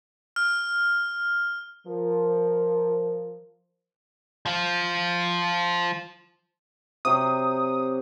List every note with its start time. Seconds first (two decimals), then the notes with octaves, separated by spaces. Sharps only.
0.36 F6
1.87 F3 A#4
4.46 F3 F4
7.05 C3 F#3 C4 D#6